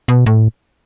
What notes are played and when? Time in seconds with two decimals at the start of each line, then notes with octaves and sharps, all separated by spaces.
0.08 B2
0.26 A2